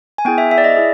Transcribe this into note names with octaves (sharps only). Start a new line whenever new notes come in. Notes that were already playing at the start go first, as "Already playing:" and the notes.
G#5
B3 E4 G#4 G5
E5
E5
D5
D#5
E4 G#4